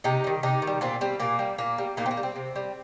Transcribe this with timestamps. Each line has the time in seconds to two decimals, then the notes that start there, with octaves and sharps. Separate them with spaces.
0.04 C3 D#4 G4
0.24 D#3 G3
0.43 C3 D#4 G4
0.62 D#3
0.67 G3
0.81 A#2 C4 F4
1.01 G3 C4
1.20 A#2 A#3
1.39 G3
1.58 A#2 A#3
1.78 G3
1.97 A#2 A#3 D#4
2.06 C4
2.11 A#3
2.17 G3
2.23 C4
2.36 C3
2.56 G3